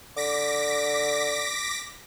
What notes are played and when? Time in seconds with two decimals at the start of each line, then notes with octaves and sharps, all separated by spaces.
0.16 D3 D6 A#6 B6